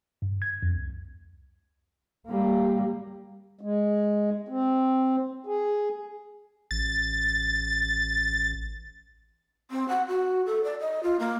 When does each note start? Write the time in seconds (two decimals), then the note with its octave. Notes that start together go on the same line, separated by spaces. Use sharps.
0.22 G2
0.42 G#6
0.63 F2
0.75 C2
2.27 G3 A#3
3.61 G#3
4.48 C4
5.46 G#4
6.71 A1 A6
9.71 C4
9.88 F#5
10.08 F#4
10.46 A4
10.64 D5
10.80 D#5
11.03 F4
11.20 A#3